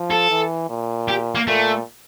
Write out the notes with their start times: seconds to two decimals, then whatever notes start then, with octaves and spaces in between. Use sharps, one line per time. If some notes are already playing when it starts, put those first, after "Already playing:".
Already playing: F3
0.11 A4
0.31 E3
0.70 A#2
1.08 G4
1.35 A#3
1.47 A#2 A3